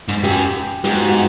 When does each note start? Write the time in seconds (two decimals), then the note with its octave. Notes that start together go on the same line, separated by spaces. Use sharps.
0.09 G#2
0.23 F#2 G4
0.84 G#2 G4
0.92 F#4
1.00 F4
1.08 F#4